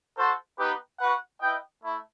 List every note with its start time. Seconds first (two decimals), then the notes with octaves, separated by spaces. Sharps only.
0.16 F#4 A4 C5
0.58 B3 D#4 G4 B4
0.99 F#4 B4 F#5
1.41 E4 B4 D#5 G5
1.82 A3 E4